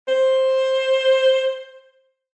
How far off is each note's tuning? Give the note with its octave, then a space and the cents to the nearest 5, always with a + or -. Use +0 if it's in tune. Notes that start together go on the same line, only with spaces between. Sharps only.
C5 +10